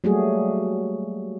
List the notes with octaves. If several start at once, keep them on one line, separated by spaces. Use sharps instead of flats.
F#3 G3 A3 A#3 F#4 G#4